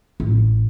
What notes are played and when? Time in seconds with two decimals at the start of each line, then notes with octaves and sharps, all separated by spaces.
0.20 A1